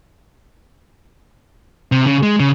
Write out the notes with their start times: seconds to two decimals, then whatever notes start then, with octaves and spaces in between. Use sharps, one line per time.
1.92 C3
2.07 C#3
2.23 G#3
2.40 C#3